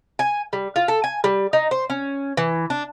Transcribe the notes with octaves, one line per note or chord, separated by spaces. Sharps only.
G#5
G3
F4
A4
G#5
G3
D#4
C5
C#4
E3
D4